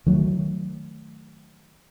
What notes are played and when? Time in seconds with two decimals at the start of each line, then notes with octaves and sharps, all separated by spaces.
0.06 D#3 F#3 A3